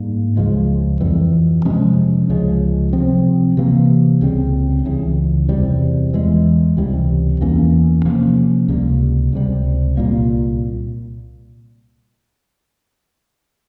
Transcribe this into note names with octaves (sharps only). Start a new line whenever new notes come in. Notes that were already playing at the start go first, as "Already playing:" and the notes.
Already playing: G#2 G3 A#3
C#2 C#3 F3 G#3
F2 E3 G3
C3 F3 G#3 C#4
C#2 C#3 F3 G#3
C3 F3 C4
C3 E3 A#3
C#2 C#3 G3 C4
C#2 C#3 E3
E2 C3 G3
E2 E3 G#3
C#2 C3 E3 G3
E2 E3 A#3 C#4
C3 F3 A#3 C#4
C#2 C3 G3 A#3
C#2 C3 G3
C2 A#2 G3 A#3